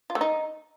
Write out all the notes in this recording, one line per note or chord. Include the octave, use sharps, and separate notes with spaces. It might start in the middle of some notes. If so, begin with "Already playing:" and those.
F4
A3
D#4